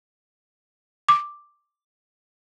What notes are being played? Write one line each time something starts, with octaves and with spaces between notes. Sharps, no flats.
D6